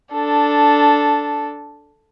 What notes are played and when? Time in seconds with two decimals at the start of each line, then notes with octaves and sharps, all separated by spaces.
0.14 D4 A4